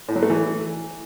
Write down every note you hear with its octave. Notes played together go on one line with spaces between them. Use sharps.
A2
F#3
A3
E3